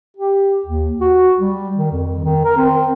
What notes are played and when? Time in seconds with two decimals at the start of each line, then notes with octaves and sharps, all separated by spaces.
0.17 G4
0.66 D#2
1.01 F#4
1.40 G3
1.77 D#3
1.92 F2
2.24 D#3
2.45 A#4
2.58 C4